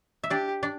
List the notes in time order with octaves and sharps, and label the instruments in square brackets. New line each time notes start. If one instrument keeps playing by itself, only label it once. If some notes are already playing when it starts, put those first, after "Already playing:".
[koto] E5
[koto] D4 D5 [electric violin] G4
[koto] D4 D5